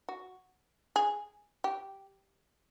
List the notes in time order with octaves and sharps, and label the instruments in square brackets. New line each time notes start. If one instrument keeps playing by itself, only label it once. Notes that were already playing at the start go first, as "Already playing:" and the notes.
[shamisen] F#4
G#4
G4